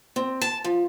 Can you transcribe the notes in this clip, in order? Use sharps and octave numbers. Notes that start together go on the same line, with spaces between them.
C4
A5
F3